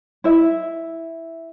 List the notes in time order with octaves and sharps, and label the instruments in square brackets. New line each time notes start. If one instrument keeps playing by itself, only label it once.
[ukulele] E4 E5